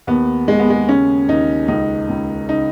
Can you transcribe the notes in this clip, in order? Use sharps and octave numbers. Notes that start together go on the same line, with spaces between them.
D#2 B3
D#2 G#3
B3
G#3
C#3 C#4
D#2 D#4
C#2 D#4
C#2
C#3 D#4